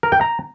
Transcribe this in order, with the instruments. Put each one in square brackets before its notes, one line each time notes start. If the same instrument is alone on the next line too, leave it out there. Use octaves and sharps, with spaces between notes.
[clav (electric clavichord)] A#4
G5
A#5